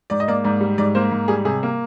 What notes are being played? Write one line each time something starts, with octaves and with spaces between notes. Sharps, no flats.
G#2 D5
D#5
A#3 D5
G#2 D5
G3
G#2 D5
A#3 C5
G#2
G3 G#4
C3 G#4
A#3